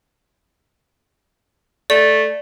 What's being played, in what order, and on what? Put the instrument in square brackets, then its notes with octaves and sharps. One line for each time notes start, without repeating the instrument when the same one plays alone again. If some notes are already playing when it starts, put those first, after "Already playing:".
[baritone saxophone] A3 [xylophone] D5